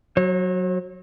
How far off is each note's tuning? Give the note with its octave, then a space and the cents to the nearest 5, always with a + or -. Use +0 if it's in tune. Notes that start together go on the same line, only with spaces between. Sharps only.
F#3 +0 C#5 -45